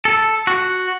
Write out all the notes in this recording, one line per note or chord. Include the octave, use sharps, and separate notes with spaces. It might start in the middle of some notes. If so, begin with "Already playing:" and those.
A4
F#4